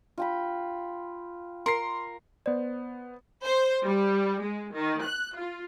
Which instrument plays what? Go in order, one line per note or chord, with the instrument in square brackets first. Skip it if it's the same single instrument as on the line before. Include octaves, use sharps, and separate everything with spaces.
[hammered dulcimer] F4 G5 B5
[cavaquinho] A#4 [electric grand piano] C6 C7
[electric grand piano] B3 C5 [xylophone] D5
[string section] C5
G3
G#3
D#3
F#6
F4